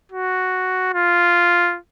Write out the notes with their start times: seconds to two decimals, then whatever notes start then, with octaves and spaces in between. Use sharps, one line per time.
0.12 F#4
0.94 F4